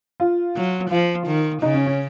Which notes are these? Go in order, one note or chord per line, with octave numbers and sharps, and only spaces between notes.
F4
F#3
F3 F4
D#3
C#3 D#4
C#4
C#4